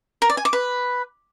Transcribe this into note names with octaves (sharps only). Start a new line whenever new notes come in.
A#4
D5
G#5
D6
B4